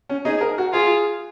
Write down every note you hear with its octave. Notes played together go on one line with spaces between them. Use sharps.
C#4
D#4 G#4
A#4
F#4
F4 G#4